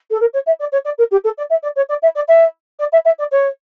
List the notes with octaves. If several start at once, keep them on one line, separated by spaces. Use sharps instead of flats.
A4
A#4
C#5
E5
D5
C#5
D5
A#4
G4
A4
D5
E5
D5
C#5
D5
E5
D5
E5
D5
E5
E5
D5
C#5